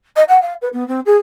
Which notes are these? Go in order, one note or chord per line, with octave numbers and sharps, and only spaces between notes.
D#5
F#5
F5
B4
B3
C4
G#4